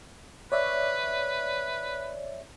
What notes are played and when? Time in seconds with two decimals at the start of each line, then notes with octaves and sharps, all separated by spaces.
0.52 B4 C#5 D5 E5